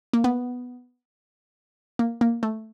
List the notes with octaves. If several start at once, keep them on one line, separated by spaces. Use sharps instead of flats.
A#3
B3
A#3
A#3
A3